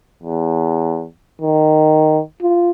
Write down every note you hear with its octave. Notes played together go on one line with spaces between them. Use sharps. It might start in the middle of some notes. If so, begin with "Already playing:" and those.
E2
D#3
F4